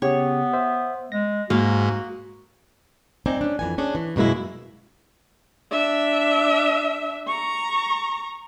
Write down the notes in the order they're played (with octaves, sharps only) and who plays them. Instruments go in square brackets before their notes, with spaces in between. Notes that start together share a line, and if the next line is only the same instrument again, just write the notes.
[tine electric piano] C#3 G4 [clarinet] B3 [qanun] C#5
[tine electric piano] C5 E5
[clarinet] G#3 [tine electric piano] A#6
[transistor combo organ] G#2 [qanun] A#3 [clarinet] F#4
[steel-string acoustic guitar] C4 D#4 D5 G#5
C#4 D4
F2 E3 G#5
C#4 D4 G#4
E3
F#2 B2 G#3 A#3 E4
[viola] D4 E5
A#5 C#6